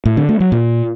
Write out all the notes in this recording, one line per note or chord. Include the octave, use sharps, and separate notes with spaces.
A2
D3
A3
F#3
A#2